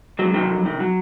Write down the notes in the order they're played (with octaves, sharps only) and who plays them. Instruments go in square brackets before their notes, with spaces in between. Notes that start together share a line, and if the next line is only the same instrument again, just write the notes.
[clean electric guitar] C#2 F#3
C3 D#3 F#3
F2
C3 D#3
F#3